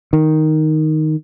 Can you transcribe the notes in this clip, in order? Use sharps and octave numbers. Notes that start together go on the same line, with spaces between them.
D#3